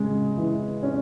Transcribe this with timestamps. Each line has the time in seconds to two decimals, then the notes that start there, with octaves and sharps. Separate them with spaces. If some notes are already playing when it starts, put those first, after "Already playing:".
Already playing: C#3 G#3
0.37 E3
0.83 C#4